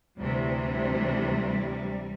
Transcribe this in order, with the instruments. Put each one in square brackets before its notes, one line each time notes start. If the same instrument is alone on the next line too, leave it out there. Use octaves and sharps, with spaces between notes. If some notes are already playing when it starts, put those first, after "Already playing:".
[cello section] D2 C3 E3 G3